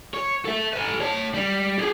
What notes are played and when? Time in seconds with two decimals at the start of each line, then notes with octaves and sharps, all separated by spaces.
0.14 C#5
0.45 A4 E5
0.73 A4 B4
1.00 C#5 A5
1.34 G3
1.79 G4 G#4